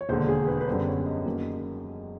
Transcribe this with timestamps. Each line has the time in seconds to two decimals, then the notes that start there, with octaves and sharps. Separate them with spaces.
0.01 C#5
0.09 E1 D#2 D3 C5
0.28 G#4
0.47 B4
0.61 B4
0.67 F#2 D3 G3 B3 C5
0.87 C#5
1.06 D#5
1.25 F#2 D#3 F#3 A#3